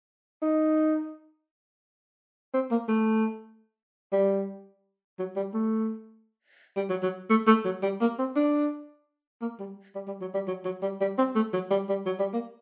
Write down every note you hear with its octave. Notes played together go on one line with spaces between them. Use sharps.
D#4
C4
A#3
A3
G3
F#3
G3
A3
G3
F#3
F#3
A3
A3
F#3
G3
A#3
C4
D4
A#3
G3
G3
G3
F#3
G3
F#3
F#3
G3
G3
C4
A3
F#3
G3
G3
F#3
G3
A#3